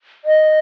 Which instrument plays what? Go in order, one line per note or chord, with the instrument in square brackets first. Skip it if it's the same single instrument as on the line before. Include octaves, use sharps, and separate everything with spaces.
[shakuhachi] D#5